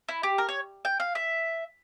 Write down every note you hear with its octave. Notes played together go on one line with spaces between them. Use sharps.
E4
G4
A#4
C#5
G5
F5
E5